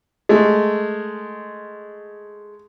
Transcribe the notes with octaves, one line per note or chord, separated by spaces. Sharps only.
G#3 A3